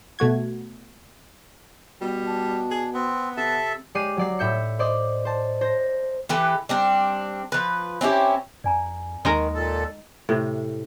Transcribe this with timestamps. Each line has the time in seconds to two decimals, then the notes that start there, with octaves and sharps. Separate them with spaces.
0.19 B2 A3 F#4 G#6
2.01 B2 G3
2.26 D4
2.71 G#4
2.94 B3 C4
3.37 C3 A4 E5 A5
3.95 G#3 G4 D5 C7 D#7
4.17 F#3 D5 C7
4.39 A2 E5 G6 C#7
4.79 C5 D5 D#5
5.25 C5 A5
5.61 C5 A#6
6.29 E3 G4 A4 B4
6.69 G3 C4 D4
7.52 F3 B4
8.01 C4 C#4 E4 G4
8.64 F2 D5 G#5 A#5
9.25 D#2 D#3 G#3 D#4 A#4
9.55 A#2 A4
10.29 A2 C3